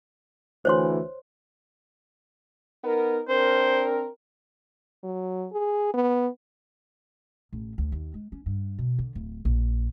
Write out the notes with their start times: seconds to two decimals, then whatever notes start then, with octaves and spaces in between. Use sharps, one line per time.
0.65 D2 E3 C5 C#5 C6
2.83 B3 D#4 A#4
3.29 C4 D4 A#4 C5
5.04 F#3
5.52 G#4
5.94 B3
7.53 A1
7.78 D2
7.92 D#2
8.14 G#3
8.32 C#4
8.46 G2
8.79 B2
8.99 D3
9.15 D1
9.45 A#1